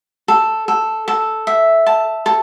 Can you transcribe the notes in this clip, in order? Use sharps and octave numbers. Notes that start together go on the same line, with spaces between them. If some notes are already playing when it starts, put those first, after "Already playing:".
A4
A4
A4
E5
A5
A4